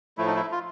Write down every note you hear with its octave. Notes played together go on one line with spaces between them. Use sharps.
A2 F3 A3 E4
D#4
E4
F4